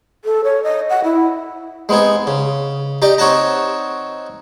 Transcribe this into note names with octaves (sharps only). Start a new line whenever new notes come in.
A4
C#5
D#5
F#5
E4
G#3 B3 C4 D#4 G#4
C#3
D#4 G4 D5 D#5
C4 D#4 C#5 F#5 A5 A#5